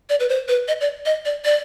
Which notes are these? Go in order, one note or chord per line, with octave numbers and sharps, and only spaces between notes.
D5
B4
C5
B4
D#5
D5
D#5
D5
D5